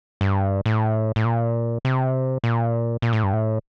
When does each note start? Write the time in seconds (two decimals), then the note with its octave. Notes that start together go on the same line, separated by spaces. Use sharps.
0.21 G2
0.66 A2
1.16 A2
1.25 A#2
1.85 C3
2.44 A#2
3.02 A#2
3.13 A2
3.23 G2
3.33 A2